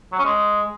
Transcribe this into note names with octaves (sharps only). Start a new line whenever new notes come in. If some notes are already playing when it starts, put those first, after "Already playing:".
F#3
C#4
G#3